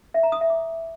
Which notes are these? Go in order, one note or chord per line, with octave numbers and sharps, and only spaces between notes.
E5
A#5
D#6
E5
D6